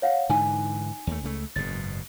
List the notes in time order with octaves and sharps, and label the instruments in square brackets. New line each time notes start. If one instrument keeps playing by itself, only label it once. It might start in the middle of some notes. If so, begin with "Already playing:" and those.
[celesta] C#5 F5 F#5
[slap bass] G#2 D3 E3 [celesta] D#4 G#5
[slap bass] D#2 A3
C#2 C#3 A3
[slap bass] F#1 G#2 B2 [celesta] A6